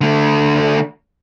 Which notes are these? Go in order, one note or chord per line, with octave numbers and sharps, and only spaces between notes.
D3 A3